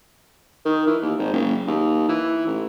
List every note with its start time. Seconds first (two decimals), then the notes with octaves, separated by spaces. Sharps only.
0.65 D#3
0.87 E3
1.02 D#2
1.19 G#1
1.33 F#1
1.67 D#2
2.08 E3
2.47 A1